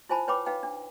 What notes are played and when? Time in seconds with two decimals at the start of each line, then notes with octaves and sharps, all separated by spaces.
0.09 E4 F4 C5 G#5 A5 B5
0.28 B4 C#5 G5 B5 D6
0.46 D#4 B4 F5 G5
0.63 D4